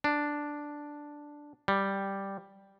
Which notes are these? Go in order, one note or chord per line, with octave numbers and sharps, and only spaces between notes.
D4
G3